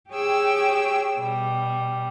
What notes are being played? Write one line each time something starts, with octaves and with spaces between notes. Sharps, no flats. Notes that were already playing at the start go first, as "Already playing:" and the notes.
G4 G#4 C#5 G5 E6
B2 G3